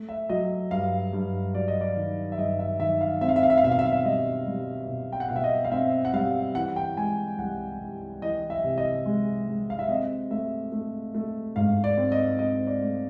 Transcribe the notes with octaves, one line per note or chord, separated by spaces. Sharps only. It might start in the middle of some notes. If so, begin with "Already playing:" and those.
Already playing: A3
E5
F#3 D#5
G2 F5
G2
F#3 D5
D#5
D5
D#3
E5
G2 D#5
E5
D#3 E5
F5
C4 E5
F5
E5
F5
E5
F5
B2 E5
F5
E5
F5
E5
G3 D#5
G3
B2
G5
F#5
B2 F5
E5
D#5
F5
C4 E5
F#5
G3 F5
E3 F#5
G5
G#3 G#5
C2 F#5
C2
E3 D#5
E5
C3
D#5
G#3
G#3
F5
E5
C4 D#5
A3 E5
A3
A3
G#2 F5
D5
C4
D#5
C4 D#5
D5
A3